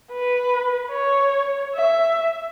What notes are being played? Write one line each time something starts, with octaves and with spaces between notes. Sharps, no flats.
B4
C#5
E5